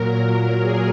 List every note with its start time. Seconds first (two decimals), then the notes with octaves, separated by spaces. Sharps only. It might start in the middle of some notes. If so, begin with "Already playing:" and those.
Already playing: A#2 F#3 A#4
0.62 G#4